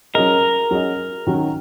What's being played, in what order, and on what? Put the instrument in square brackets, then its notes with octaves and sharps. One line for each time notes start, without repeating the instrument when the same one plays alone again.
[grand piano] F#3 C#4 G#4 D#5 [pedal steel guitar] A#4
[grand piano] F#3 C#4 G#4 D#5
D#3 F#3 C#4 F#4